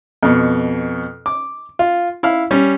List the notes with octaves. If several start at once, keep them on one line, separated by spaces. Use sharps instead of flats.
F2 B2
D6
F4
E4 F5 F6
G3 C#4